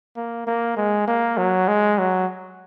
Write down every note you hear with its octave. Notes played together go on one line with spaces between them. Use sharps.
A#3
A#3
G#3
A#3
F#3
G#3
F#3